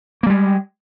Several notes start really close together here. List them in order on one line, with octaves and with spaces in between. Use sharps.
A#3 G3 G#3